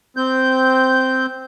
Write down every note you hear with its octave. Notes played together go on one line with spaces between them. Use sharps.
C4 G6